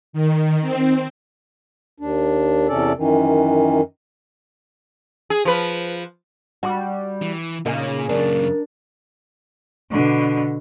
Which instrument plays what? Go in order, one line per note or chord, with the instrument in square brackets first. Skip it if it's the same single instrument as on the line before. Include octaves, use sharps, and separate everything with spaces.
[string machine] D#3
C4
[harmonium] D#2 D4
E2 C3 C#4 A4 D5
F#2 D#3 E3
[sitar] G#4
F3 B4
[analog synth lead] G3 [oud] F#4
[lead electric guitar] E3
[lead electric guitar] A#2 [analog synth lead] C#3 [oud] A#3 D#4
[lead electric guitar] F#2 A#2 [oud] D4 [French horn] A#4
[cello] B2 D3